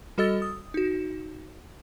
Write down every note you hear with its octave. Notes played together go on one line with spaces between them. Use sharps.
G3 F#4 A4 D#5 E6 A6
D#6
D#4 F#4